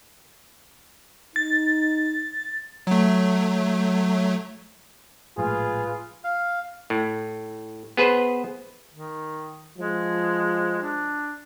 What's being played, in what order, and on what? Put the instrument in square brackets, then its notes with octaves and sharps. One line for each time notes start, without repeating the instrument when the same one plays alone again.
[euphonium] D#4 [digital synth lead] A6
[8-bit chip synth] F#3 A3
[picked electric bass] A#1 A2 G#3 [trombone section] F4 B4 [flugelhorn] G#4
[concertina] F5
[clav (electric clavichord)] A2
B3 G#4 B4 C5
[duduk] D#3
[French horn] F3 [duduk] G#3
[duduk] D4